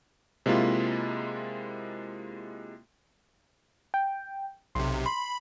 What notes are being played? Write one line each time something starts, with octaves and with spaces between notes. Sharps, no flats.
C3 G#3 A#3 E4 F4
G5
B1 C3 C6
B5 C6